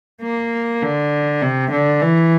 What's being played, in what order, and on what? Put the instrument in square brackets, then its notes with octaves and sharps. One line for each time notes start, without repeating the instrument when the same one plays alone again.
[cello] A#3
D3
C3
D3
E3